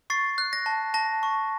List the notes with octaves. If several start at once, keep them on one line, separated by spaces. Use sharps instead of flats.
C#6 A6 C7
F#6
A#6
A5
A5 A#6
C#6